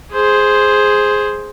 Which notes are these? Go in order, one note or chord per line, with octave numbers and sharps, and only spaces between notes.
G#4 C5